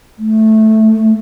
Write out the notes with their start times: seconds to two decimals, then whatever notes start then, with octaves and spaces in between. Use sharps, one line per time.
0.19 A3